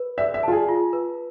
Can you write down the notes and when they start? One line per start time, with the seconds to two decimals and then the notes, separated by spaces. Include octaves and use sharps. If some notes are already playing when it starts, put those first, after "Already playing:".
Already playing: B4
0.18 D5 E5
0.34 E5
0.43 F4 A5
0.52 G#4
0.69 F4
0.93 B4